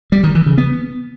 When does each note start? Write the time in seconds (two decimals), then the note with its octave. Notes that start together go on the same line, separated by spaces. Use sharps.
0.12 G3
0.24 D#3
0.35 E3
0.46 C#3
0.58 B3